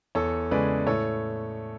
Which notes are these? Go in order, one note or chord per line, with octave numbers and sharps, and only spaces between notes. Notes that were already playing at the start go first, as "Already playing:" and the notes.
E2 A4 C#5
C#3 G#3 B4 D5
A2 A4 C#5